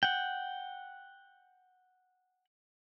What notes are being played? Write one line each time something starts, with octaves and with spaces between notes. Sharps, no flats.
F#5 G5